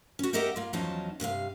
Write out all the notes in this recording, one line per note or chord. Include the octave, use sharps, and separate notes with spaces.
C#4 F#4
G4 A#4 D#5 E5 F#5 G5
A#3 F4
E2 F3 F#3 C#4 D#4 A5
G2 C3 B4 F5